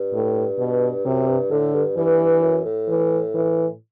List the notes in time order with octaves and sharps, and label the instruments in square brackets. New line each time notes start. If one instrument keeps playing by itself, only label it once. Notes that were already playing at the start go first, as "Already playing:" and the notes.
Already playing: [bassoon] G2
[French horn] A2
B2
[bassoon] F#2 [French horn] C3
[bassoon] G2
[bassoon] A2 [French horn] D3
[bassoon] G2
[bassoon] G2 [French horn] E3
[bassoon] F#2
A2
[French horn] E3
E3